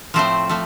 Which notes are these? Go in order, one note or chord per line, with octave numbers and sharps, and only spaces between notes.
A2 F3 A3 C4 C5
F3 A3